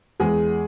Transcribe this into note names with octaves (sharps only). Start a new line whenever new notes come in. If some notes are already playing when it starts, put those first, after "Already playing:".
E2 G#3 G#4